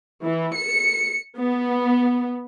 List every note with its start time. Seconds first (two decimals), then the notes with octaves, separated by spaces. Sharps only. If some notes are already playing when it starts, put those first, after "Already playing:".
0.23 E3
0.54 C#7
1.37 B3